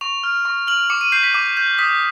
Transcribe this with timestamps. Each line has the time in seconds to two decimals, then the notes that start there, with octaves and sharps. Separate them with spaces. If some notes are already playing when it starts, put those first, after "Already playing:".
0.01 C#6 F7
0.23 F6
0.45 C#6
0.67 F6 F#7
0.90 D6 C#7
1.01 D#7
1.12 G6 C7
1.23 B6
1.34 D6
1.57 G6
1.78 D#6 B6